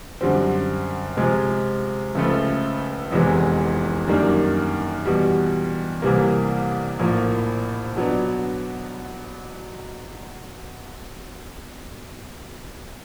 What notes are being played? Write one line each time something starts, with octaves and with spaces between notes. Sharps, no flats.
F#2 D3 G3 C4
C3 F3 G#3
C#2 C#3 F3 A3
F1 E2 C3 E3 G#3
F#2 D#3 G3 A#3 D4
E2 B2 G3
C2 C3 E3 G3 A#3
A#1 A2 F3 A#3
B2 F#3 B3 D4